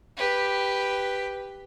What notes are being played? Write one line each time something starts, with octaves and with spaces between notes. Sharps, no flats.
G4 B4